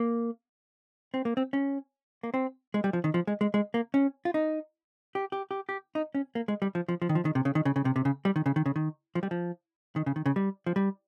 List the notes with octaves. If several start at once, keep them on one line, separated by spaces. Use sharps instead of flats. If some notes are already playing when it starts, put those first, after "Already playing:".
Already playing: A#3
C4
A#3
C4
C#4
A#3
C4
G#3
G3
F3
D#3
F3
G#3
G#3
G#3
A#3
C#4
F4
D#4
G4
G4
G4
G4
D#4
C#4
A#3
G#3
G3
F3
F3
F3
D#3
F3
D#3
C3
C#3
D#3
C#3
C#3
C3
C3
C#3
G3
D#3
C#3
D#3
C#3
D#3
F3
G3
F3
D#3
C#3
D#3
C#3
G3
F3
G3